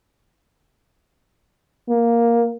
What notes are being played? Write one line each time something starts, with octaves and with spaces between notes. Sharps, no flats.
A#3